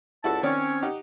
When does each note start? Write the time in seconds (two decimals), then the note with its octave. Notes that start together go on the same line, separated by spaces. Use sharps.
0.24 C#2 E4 F#4 A4 D5 A5
0.43 D#3 C4 C#4 C#5 D5
0.82 D#4 G4 F#5